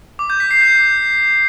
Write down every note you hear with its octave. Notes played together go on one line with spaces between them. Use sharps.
D6
G6
B6
C7
G6